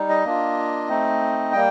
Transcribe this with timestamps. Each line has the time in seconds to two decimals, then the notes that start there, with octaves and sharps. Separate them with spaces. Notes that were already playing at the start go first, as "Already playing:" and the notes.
Already playing: G3 D#4
0.09 D#5
0.25 A#3 D4 F4
0.88 A3 C4 D#4
1.53 G3 A#3 G5